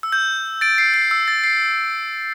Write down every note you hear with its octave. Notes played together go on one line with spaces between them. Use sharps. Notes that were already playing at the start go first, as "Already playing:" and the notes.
E6
G6
A6 D7
C7
C7
E6
A6
C7